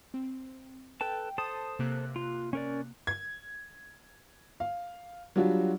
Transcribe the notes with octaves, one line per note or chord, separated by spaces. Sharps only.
C4
A4 B4 G5 A5
A4 C5 A5 D#6
C3 A#3 F#6
F4
C#4 A#4 D5
G#6
F5
F#3 G3 D4 F4 F#4